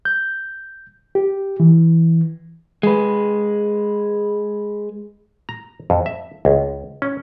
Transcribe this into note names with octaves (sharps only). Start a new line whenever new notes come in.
G6
G4
E3
G#3 B4
A#5
F2
E5
C#2
C#4